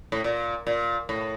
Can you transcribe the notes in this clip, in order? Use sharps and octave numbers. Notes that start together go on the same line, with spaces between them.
A2
A#2
A#2
A2